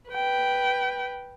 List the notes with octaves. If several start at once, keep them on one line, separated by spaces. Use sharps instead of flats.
B4 G5